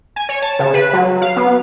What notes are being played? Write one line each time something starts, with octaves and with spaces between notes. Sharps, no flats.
G#5
C#5
A5
C#3
B4
F#3
F5
B3